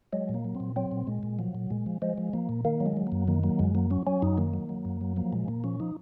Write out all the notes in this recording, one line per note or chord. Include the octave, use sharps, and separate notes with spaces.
F#3 G#3
A#2
A#3
F#3
C4
A#2
F#3 C4
A#2
A#2 G#3
A#2
F3 F#3
A#2
A#2 G#3
F3
F3 G#3
F3
F3 A#3
A#2
D#3 A#3
F#3
G#3
F#3
A#3
F#2
D#3 A#3
F#3 A#3
F#2 G#3
F#3 A#3
F#3 C#4
F#3 C#4
F#2 D#4
D#3 A#3
F#3
F#3
F#2
F#3
F3 A#3
A#2 G#3
A#2 A#3
F3 C#4
F3 D#4